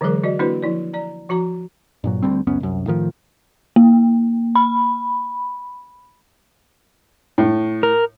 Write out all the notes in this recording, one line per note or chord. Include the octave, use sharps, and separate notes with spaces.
D3 E3 F#3 G#3 G#4 A#4
F#4 D5 D#5
A#3 D4 E4 F#4 B4 C5
F3 E4 D5
D5 A#5
F3 F#4 A#5 D6
G2 A#2 F#3
D2 G3 C4
C#2 F#2 B3 C#4
C2 F#2
A2 D#3 F3
A#3
B5
A2
A#4